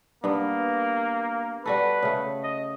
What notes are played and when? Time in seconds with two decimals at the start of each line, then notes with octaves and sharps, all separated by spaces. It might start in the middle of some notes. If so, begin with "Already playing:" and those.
0.24 G2 A#3 B3
1.66 G3 F#4 A4 B4
2.03 C#3 A3
2.43 D#5